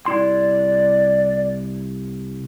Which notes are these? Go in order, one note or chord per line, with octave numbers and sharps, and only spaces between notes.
C2 E4 D5 C6